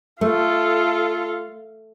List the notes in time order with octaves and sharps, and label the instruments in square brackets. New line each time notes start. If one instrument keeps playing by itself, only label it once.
[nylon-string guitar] A3 [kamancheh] F4 A4